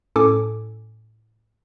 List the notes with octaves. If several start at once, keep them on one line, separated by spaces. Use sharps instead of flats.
A2 C#4 A4 G#5 D6